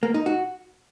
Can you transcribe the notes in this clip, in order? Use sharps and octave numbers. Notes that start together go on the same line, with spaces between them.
A#3
D#4
F#4